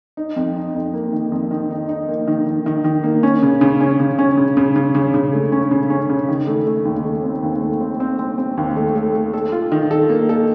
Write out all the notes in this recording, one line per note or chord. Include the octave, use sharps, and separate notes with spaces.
D#4
F2
D#4
F2
A#3
D#3
F2
D#3
D#4
D#4
A#3
D#3
D#3
D#3
D#3
A#3
C#4
C#3
C#3
C#4
C#3
C#4
C#3
C#3
C#3
C#3
C#3
A3
C#4
C#3
C#4
C#3
D#3
A3
A3
D#2
A3
C4
D#2
A3
C4
C4
C4
C4
D#2
A3
A3
A3
A4
F4
D#3
A4
A#3
A4